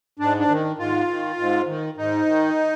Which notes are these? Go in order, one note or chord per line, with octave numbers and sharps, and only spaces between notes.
G#2 D4
D4
D#3
G#2 F4
D#3
G#2
D#3
G#2 D#4
D#3